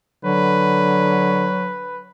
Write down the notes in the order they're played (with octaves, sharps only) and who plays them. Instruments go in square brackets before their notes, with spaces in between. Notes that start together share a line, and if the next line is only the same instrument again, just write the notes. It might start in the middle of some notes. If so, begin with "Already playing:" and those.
[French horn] D3 [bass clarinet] F#3 [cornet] B4